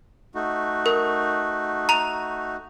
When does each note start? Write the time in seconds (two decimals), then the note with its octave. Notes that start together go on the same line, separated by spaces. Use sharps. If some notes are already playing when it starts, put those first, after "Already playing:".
0.35 A3 D#4 F#4
0.86 A#4
1.89 A#5 F7